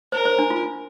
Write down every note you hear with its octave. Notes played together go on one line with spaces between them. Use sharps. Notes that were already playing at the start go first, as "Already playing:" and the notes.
A#4 C5
C5
D4
F4